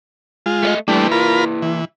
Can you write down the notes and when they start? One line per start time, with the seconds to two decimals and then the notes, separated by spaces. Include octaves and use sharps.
0.46 G#3 F4
0.63 A3 D5 D#5
0.88 G3 A3 A#3 D4 E4 B4
1.12 F4 A#4 B5
1.62 E3